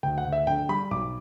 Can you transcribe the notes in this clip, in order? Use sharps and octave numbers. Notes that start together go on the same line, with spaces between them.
D2 G5
F#5
D2
E5
D3 G5
G3 B5
B1 D6